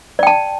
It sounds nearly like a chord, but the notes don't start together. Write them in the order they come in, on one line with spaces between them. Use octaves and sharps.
D5 G5 A5